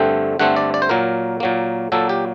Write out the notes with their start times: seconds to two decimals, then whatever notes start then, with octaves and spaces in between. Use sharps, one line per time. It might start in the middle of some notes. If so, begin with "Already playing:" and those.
Already playing: G2 D3 A3 C4 G5
0.39 G2 D3 A3 C4 F#5
0.56 D5
0.74 D5
0.82 C5
0.89 A#2 F#3 A#3 A#4
1.40 A#2 F#3 A#3
1.92 A#2 F#3 A#3 A4
2.09 G4